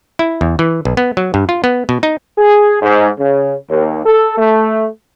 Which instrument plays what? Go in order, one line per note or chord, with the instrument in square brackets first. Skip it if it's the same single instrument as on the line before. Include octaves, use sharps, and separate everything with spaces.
[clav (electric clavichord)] E4
E2
E3
B1
B3
F#3
G2
F4
B3
B2
D#4
[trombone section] G#4
G#2
C#3
D#2
A4
A3